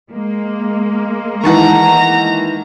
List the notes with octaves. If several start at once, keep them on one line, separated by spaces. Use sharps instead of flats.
G#3 A#3
D#3 E3 F#5 A5 A#5 C#6